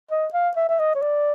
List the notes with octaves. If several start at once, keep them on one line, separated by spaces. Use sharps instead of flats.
D#5
F5
E5
E5
D#5
C#5
D5